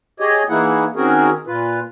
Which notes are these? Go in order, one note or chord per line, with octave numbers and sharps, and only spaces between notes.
G4 G#4 C#5 D#5
E3 A#3 D#4 E4 G#4 F#5
D#3 C4 C#4 F#4 G#4 A#4
A#2 F4 B4